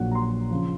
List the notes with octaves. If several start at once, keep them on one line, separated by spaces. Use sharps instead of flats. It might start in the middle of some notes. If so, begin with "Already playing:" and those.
Already playing: A#1 A#2 F#3 F#5
A#5
C6
C#3 F3